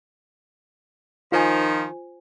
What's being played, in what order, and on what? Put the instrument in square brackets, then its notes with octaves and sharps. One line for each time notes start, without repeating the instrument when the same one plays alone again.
[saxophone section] D#3 F3 D#4 [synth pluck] F4 C5 G#5